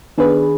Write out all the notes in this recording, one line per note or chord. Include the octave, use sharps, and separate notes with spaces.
D#3 B3 D4 G#4 B4